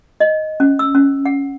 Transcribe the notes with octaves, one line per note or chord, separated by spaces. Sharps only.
D#5
C#4
E6
C#4
F#5